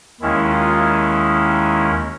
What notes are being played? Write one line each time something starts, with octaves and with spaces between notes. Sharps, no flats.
D#2 D#3 G#3 C#4 E4
F4
E4